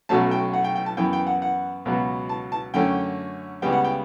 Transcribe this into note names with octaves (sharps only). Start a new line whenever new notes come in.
B1 B2 F#3 A3 C#4 A5
G5
F#5
G5
G5
A5
F#2 E3 B3 G5
G5
F#5
F#5
C#2 B2 F#3 B3
A5
A5
F#2 D3 A3 C#4 G5
C#2 C#3 G3 B3 G5
F#5
G5